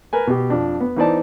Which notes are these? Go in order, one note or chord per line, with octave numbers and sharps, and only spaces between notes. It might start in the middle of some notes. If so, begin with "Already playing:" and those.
A#4 B4 G#5
B2 G4
F2 D4
B3
E3 B3 D#4 C5 D5 A5